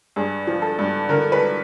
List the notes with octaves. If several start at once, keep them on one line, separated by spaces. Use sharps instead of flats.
G2 G#4
F3
A4
G2
D3 A#4
B4